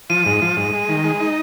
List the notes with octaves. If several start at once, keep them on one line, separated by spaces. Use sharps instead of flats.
F3 D#7
G#2
F3
G#2
G#3
D#3
G#3
D#4